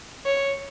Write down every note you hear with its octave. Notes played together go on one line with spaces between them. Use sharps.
C#5